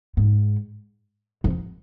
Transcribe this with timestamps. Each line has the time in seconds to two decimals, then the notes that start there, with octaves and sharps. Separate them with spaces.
0.17 G#2
1.44 F2